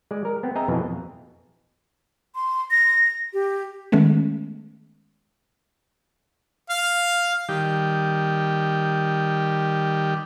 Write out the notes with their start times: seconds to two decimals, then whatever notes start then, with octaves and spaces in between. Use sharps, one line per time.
0.11 G#3 D5
0.25 A#4
0.43 B3 C4
0.55 C4 G#4 D#5 E5 A#5
0.68 F2 B2 E3
2.35 C6
2.71 A#6
3.33 G4
3.92 D#3 G#3 A3 B3 C#4
6.70 F5
7.49 D#3 G3 G4